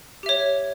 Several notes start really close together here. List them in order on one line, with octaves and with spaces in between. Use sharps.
G4 E5 C#5